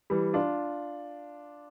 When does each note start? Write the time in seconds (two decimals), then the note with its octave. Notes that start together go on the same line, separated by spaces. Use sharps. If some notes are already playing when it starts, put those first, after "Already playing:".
0.10 E3 G3
0.33 D4 F4